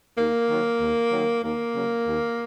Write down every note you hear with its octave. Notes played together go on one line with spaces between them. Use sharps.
D#2 A#3
D#3 F#3
D#2
D#3 F#3
D#2 A#3
C#3 F#3
D#2